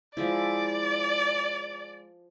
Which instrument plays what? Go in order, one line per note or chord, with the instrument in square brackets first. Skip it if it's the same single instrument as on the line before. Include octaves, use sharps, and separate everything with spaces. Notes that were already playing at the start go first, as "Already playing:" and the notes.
[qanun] F3 G#3 E4 [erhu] D5